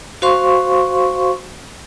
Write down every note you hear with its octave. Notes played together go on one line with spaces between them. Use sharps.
F#4 C5 F5 C6 C#6